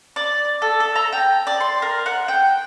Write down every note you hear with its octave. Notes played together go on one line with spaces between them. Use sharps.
D5
A4
A4
A#5
G5
D5
C6
A#4
F#5
G5